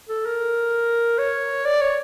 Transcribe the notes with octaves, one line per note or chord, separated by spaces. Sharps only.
A4
A#4
C#5
D5
C#5